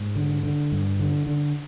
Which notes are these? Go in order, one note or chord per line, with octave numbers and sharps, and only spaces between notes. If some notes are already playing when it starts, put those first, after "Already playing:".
Already playing: G#2
D3
D3
G2
D3
D3